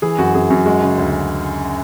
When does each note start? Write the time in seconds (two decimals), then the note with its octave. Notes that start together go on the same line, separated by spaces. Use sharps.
0.02 E3 G#4
0.18 F#2 F#4
0.34 F#2 G#4
0.50 F#2 F#4
0.66 G#3 F#4
0.82 C#3
0.98 D2